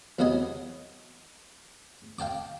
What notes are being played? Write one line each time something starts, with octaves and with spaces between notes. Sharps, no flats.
E2 C3 F#3 B3 D#5 G#5
F5 G5 A5 D6